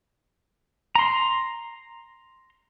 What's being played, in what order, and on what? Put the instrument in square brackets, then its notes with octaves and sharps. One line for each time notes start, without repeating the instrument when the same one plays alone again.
[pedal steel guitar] A#5 C6